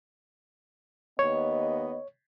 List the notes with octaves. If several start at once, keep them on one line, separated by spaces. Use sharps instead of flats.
D#2 B3 C#5 D#5